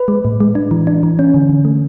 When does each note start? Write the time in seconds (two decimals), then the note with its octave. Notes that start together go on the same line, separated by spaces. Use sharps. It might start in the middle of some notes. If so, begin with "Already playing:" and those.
Already playing: B4
0.08 G#3
0.25 A2
0.40 G#3
0.55 D4
0.71 E3
0.87 D4
1.03 E3
1.19 C#4
1.34 D3
1.49 D3
1.65 A3